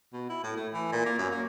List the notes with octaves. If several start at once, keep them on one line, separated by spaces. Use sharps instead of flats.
B2
E4
A2
A3
E3
A#2
A#3
F#2
A#3